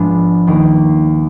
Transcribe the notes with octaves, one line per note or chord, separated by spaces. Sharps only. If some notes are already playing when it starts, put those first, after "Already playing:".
Already playing: G#2 F3 G#3 B3 D4
D#2 D#3 A#3